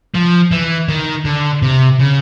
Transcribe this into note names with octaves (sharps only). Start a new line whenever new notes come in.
F3
E3
D#3
D3
C3
C#3